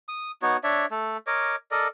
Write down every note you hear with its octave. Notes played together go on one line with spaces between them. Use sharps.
D#6
B3 D#4 F#4 C#5
D4 C#5 D5 E5
A3 A4
A#4 C#5 D#5 D6
A4 A#4 D5 D#5